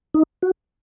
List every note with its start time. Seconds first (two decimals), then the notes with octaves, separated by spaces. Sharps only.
0.14 D#4
0.43 F#4